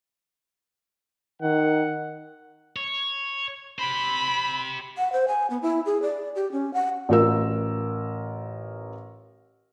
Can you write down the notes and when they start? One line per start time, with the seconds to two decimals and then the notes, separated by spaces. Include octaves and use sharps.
1.42 D#3 F#5
2.76 C#5
3.79 G4 C5 B5
4.98 F#5
5.13 C5
5.28 G#5
5.50 B3
5.62 E4
5.86 G#4
6.02 D5
6.36 G4
6.52 C#4
6.74 F#5
7.09 A1 F4 A#4 E6